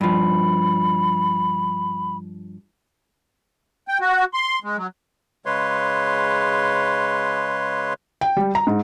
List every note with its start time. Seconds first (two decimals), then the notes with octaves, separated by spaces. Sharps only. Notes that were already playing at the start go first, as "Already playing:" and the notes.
0.01 G2 F3 B5
3.88 G5
4.01 F#4
4.34 C6
4.64 G#3
4.77 F#3
5.46 C#3 G#3 B4 C#5 C6
8.21 G5
8.37 G3
8.55 A#5
8.67 G#2